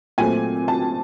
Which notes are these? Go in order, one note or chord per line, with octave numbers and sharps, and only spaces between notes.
A#2 F#3 A3 C4 G#5
A5